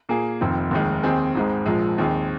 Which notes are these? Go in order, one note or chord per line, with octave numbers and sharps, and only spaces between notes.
A#2 A#3 G#4
F1 F2 D#3 C4
F1 D#2 D#3 G#3
D#2 D#3 C4 G#4
G#1 G#2 G#3
A#1 A#2 F3 G#3
D#2 D#3 C4 G#4